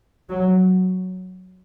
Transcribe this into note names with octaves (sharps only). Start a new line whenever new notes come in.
F#3